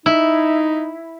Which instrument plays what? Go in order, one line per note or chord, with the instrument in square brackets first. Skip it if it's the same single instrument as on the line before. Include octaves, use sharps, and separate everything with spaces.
[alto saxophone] D#4 [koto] E4